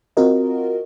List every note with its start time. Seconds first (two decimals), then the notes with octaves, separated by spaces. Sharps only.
0.17 C4 F4 F#4 A#4 D#5